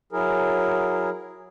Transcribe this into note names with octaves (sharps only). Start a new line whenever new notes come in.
F#3 E4 G#4 A#4